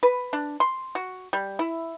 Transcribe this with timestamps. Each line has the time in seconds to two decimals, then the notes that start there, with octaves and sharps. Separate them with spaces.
0.03 B4
0.33 D4
0.60 C6
0.95 F#4
1.33 G3
1.59 E4